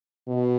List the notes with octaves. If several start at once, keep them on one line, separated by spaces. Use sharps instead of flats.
B2